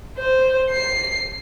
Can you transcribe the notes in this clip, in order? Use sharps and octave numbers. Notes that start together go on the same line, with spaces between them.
C5
C7